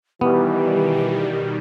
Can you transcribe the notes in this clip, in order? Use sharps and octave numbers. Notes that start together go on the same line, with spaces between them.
B2 D#3 E3 G3 B3 G4